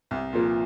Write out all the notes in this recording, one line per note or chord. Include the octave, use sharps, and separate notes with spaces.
C2
A#2 F3 A#3